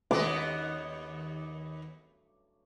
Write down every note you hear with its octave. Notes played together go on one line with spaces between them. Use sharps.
D#2 B3 D#5 D6